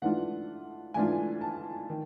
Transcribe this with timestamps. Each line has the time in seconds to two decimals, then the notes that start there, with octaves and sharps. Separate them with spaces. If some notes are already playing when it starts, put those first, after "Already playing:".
0.02 G#2 E3 A3 D4 F4 F#5
0.94 G#2 E3 A3 D4 F4 G#5
1.41 A5
1.90 D#3